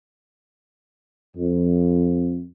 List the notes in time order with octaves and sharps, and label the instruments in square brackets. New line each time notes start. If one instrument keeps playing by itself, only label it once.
[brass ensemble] F2